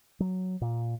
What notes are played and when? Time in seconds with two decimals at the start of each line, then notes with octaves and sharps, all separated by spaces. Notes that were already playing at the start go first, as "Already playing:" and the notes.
0.20 F#3
0.61 A#2